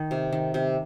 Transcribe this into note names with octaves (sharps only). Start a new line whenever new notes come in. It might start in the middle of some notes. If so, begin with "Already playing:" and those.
Already playing: D#3
C3
D#3
C3